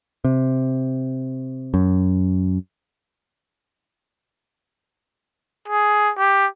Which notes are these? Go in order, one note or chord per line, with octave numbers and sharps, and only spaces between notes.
C3
F#2
G#4
G4